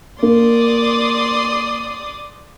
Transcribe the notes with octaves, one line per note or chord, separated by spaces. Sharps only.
A#3 D5 C6 D#6